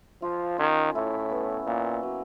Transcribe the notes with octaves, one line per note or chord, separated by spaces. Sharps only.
F3 F4
D#3 C#4
A2 E4
B3
A#2 A#3
F#3